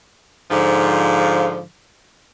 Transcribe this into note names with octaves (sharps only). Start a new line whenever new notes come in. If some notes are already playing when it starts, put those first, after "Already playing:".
G#2 D3 F3